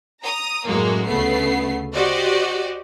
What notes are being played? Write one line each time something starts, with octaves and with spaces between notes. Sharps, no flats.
A#5 D#6
F#2 A2 G#3 A#3 F#4
D2 C#3 A3 B3 C7
F#4 G4 C5 D5 D#5